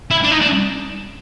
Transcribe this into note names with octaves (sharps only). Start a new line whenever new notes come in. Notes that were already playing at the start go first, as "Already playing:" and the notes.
E4
D4
D#4
D4